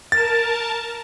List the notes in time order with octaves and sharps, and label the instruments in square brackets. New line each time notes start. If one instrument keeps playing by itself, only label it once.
[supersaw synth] A#4 A5 [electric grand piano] A6